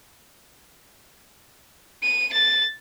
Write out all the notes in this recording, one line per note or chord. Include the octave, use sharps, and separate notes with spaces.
D#7
A6